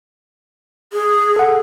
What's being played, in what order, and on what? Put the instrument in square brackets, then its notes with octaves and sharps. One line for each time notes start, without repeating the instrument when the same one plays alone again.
[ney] G#4
[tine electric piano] A4 F#5